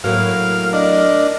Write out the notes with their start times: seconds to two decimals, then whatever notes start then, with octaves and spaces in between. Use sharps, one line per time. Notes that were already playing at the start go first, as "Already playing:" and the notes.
0.04 A2 F#3 A#3 A#4 F5
0.73 D4 D#5